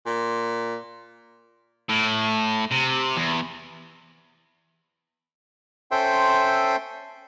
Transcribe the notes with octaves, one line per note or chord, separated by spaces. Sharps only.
A#2
A2
C3
E2
C#4 A4 C5 E5 G5 C6